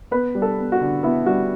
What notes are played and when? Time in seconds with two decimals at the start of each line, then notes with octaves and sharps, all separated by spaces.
0.11 B3 B4
0.35 G3
0.42 A4
0.58 B3
0.72 F#4
0.80 D3
1.03 B3 E4
1.26 G3 F#4